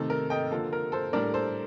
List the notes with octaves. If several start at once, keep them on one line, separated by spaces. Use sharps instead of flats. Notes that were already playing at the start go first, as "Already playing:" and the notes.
Already playing: C3 D#3 A3 A4
A#4
D#5 G5
D3 F3 A#3 A4
A#4
A4 C5
A2 G3 D4 A#4 D5
A4 C5